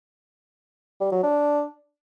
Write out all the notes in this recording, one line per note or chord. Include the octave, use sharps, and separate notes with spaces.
G3
F#3
D4